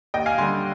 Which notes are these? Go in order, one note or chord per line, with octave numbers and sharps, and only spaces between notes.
D#2 D#5 G5
F5 G#5
D3 G3 G#5 C6